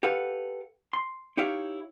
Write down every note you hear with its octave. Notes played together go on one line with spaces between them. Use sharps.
G4 A4 B4 F5 F#5
C6
D#4 E4 G4 C#5 E5 F5